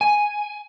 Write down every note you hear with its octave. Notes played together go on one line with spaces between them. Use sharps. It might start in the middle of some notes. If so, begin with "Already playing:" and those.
G#5